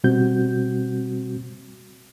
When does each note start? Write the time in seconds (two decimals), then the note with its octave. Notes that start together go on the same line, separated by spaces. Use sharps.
0.04 B2 G3 C4 F#4 G6